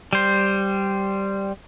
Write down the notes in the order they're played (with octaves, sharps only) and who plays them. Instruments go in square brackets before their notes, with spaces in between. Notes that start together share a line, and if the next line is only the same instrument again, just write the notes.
[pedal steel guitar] G3 C5